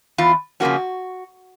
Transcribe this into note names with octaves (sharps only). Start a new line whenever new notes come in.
E2 F4
C#3 F3 A#3 C#4 F#4